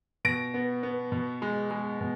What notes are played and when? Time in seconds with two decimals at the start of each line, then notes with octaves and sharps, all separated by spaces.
0.25 B2 A#6 D7
0.54 B3
0.83 B3
1.12 B2
1.42 G#3
1.71 G#3
2.00 B2